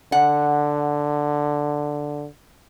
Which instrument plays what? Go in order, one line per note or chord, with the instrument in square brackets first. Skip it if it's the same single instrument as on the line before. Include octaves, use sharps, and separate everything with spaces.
[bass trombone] D3 [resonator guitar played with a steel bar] F#5